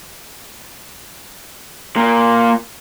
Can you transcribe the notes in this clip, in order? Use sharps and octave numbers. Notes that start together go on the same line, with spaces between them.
A#2 A#3